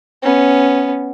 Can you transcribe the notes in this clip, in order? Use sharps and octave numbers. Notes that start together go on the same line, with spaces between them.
B3 C#4